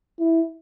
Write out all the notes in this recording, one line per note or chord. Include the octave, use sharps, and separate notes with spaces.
E4